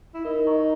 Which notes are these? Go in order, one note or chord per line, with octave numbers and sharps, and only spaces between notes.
E4
D#4 A#4
D#5 A#5 C#6